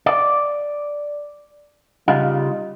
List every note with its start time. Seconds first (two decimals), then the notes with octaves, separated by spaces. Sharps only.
0.06 D5
2.08 C#3 G3 D#4 F4